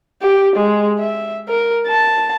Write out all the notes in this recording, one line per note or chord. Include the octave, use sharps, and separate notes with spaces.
G4
G#3
E5
A#4
A5